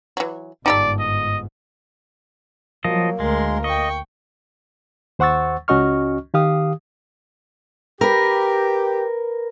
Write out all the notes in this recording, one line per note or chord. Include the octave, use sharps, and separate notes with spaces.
E3 F#3
G1 G#2 D#4 G4 A4 D5
D#5
F3 F#3 A#3 D#5
D2 G#3 A#4 C6
D#5 G5 C#6
D#2 C5 F#5 C#6 E6 A6
C#2 C#4 F#4 D#5 C#6 F6
D#3 G4 F5 D#6
G4 A#4 B4